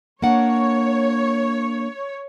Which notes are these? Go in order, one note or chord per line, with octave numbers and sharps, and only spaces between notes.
A#3 D4 C#5 F#5